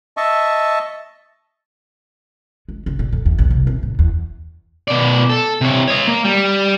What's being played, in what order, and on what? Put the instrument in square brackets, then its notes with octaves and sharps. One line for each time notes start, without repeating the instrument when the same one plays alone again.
[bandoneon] D#5 E5 A5 C#6
[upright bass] G#3
C#3
A#2
F2
E2
A#1
C2
C3
A2
E2
[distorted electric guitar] B2 D5
A4
C3 C#5
C#5 D#5
A#3
G3